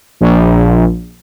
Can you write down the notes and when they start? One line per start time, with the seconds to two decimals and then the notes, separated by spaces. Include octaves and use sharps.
0.21 A#1